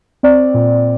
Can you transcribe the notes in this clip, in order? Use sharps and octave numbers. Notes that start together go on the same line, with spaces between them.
C4 D5
A#2